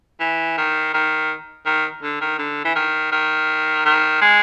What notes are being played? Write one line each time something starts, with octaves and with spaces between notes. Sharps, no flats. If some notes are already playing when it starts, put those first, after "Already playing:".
E3
D#3
D#3
D#3
D3
D#3
D3
E3
D#3
D#3
D#3
G#3